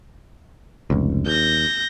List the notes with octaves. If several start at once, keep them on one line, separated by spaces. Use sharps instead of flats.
F1 C#2
D#2 G6 A#6